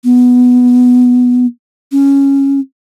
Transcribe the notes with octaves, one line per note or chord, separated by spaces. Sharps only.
B3
C#4